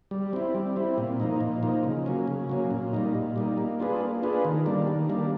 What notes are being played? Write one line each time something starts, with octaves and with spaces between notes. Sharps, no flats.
G3
C4 E4
G3
C4 E4
A#2
F3 A#3 D#4
A#2
F3 A#3 D#4
C#3
F#3 A#3 C#4
C#3
F#3 A#3 C#4
A#2
G3 A#3 D#4
A#2
G3 A#3 D#4
A#3
D4 F4 G#4 B4
A#3
D4 F4 G#4 B4
D#3
G3 A#3 D4
D#3
G3 A#3 D4